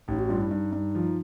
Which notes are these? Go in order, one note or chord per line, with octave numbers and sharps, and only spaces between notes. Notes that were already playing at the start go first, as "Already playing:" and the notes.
A1 D#4
F#4
G2 F4
E4
G2 D#4
G2
F3